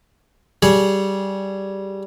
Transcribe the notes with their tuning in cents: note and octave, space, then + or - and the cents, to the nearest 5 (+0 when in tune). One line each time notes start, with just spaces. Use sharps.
G3 -10 G#4 +0 C#5 +0